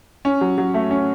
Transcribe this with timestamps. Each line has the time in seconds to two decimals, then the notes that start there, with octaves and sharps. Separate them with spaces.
0.25 C#4
0.41 F#3
0.58 F#3
0.74 A3
0.91 C#4